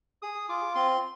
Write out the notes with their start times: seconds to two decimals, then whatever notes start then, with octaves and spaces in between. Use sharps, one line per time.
0.22 G#4 D#6
0.49 F4 D6
0.75 C4 C6